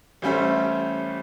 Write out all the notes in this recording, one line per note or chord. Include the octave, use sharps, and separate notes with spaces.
A1 G3 A3 C#4 C5 E5